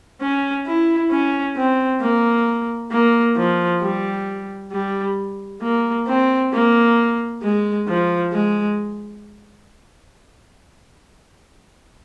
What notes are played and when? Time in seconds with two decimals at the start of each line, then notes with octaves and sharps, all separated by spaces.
0.22 C#4
0.66 E4
1.11 C#4
1.56 C4
2.01 A#3
2.91 A#3
3.37 F3
3.82 G3
4.72 G3
5.62 A#3
6.07 C4
6.53 A#3
7.42 G#3
7.87 F3
8.33 G#3